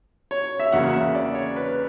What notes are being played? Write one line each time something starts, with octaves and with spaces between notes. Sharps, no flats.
C#5
E5
E2 C#3 F#3 A#3 F#5
E5
D5
C#5
B4